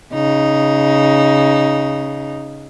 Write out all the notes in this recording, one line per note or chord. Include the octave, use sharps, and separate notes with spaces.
C#3 D#4